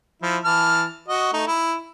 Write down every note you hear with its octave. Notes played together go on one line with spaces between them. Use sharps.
F3 E4
E3 A5 F6
F#4 D#5
A3 D#4
E4